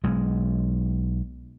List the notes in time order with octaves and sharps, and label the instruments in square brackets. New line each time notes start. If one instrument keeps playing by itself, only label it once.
[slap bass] B1 G#3